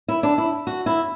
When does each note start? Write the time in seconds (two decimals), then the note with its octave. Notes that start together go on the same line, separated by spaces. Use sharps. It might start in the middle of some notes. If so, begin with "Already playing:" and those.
0.08 E4
0.23 D4
0.38 E4
0.67 F#4
0.86 E4